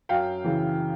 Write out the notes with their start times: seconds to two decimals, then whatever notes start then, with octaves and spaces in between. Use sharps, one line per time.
0.09 F#2 F5 G5
0.44 C#3 E3